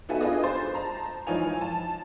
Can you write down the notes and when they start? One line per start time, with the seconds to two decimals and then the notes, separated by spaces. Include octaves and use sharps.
0.09 B3 D#4 F#4 A4 E5 G#5
0.21 D4 F4 G4 G#4 B4 D#5
0.43 C5 C6 A6
0.74 A5 A#5
1.27 E3 F3 D#4 C#5 G#5 F7
1.61 A5